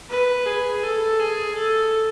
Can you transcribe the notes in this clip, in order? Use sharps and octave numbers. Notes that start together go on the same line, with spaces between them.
B4
G#4
A4
G#4
A4